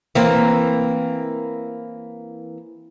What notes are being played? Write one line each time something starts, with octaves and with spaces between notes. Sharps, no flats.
E3 A#3 C4